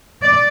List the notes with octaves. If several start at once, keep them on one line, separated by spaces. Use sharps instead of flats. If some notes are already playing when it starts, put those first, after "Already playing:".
D5